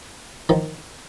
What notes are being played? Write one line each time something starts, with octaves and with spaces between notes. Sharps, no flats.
D#3 F3